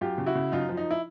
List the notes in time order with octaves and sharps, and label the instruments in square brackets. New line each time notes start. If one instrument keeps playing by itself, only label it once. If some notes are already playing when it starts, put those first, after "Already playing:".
[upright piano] F#2 F4 G4
C#3
E4 F#4
C#3
F#2 D#4 F4
F3
D#4
E4